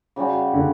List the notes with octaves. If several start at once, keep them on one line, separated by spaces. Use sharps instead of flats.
C#3 G3 C#4 F#4
D3